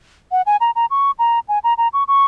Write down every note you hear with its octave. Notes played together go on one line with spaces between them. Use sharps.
F#5
G#5
A#5
A#5
C#6
A#5
G#5
A#5
A#5
C#6
C#6